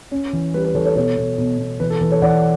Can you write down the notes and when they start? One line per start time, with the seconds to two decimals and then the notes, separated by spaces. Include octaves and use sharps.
0.11 C#4
0.33 E3
0.54 G3 B4
0.65 B4
0.75 E3 A4 C#5
0.85 A4 C#5
0.96 B2 A4 C#5
1.17 B2
1.38 B2
1.59 B2
1.80 E3 B4
1.90 A4
2.01 E3 B4
2.11 A4 C#5
2.22 E3 D5 F#5